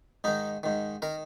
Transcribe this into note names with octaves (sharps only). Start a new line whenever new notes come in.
G#2 D#3 D#4
G#2 D#3
D#3 A#4